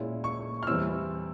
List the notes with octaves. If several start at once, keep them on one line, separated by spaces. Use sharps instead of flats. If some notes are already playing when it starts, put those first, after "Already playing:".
Already playing: A#2 G#3 C#4 E4
C#6
F6
E2 E3 G3 C4 E4 E6